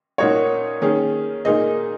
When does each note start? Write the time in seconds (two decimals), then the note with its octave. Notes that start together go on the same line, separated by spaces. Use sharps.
0.18 A#2 A#3 D#4 F#4 C#5
0.81 D#3 A#3 C#4 G#4
1.45 A#2 A#3 D#4 G#4 D#5